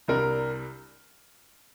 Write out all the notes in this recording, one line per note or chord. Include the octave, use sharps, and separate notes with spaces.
C2 C3 G3 D4 A#4